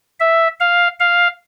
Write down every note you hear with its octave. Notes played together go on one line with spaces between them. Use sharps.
E5
F5
F5